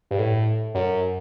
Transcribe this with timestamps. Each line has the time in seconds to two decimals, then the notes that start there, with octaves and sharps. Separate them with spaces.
0.11 G2
0.19 A2
0.75 F#2